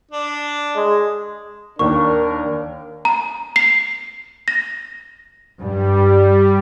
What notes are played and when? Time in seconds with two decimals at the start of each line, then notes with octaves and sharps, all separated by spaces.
0.11 D4
0.75 G#3
1.79 D#2 A#3 D4 A#4 C#6
3.05 A#5
3.56 C7
4.48 A#6
5.59 G2 G3